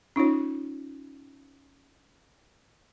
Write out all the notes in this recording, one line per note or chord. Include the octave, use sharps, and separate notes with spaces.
C#4 D#4 F4 C#5